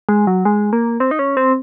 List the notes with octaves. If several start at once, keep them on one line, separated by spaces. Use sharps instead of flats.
G#3
F#3
G#3
A#3
C4
D#4
C#4
C4